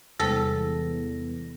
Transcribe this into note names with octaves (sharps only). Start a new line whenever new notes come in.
E2 C3 G3 G#3 A4 A#6